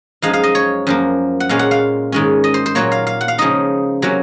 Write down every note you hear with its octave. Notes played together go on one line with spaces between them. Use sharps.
F#2 F3 G#3 D#4 F5
F5
D#5
C#5
F#2 F3 A#3
F#5
A#2 G#3 C#4 F5
F#5
F5
G#2 D#3 G#3 C#4
D#5
C5
C5
A#2 F#3 A#3 C#5
F5
F5
F#5
F5
C#3 F3 G#3 D#4 D#5
C3 F#3 A#3 C#4